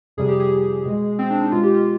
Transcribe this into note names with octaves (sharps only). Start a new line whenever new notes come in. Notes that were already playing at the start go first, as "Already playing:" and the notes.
F2 C3 G3 G#4
G4
G#4
B2 G#3
C4
D4
D#4
B2 G#3 F4
G4
F4